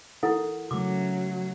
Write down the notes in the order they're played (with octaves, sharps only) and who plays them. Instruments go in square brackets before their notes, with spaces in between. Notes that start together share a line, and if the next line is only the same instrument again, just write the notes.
[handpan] E3 A#4 [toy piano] E4 A4 F#5
[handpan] C#3 A3 [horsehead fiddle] F#3 [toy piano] D6